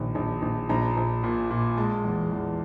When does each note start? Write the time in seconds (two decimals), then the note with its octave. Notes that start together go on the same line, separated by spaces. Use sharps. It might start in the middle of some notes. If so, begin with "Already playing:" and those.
Already playing: A#1 D#3
0.15 A#1
0.42 A#1
0.69 A#1 A#5
0.97 A#1
1.23 A#2
1.50 A#2
1.77 G#3 A5
2.04 E2
2.31 E2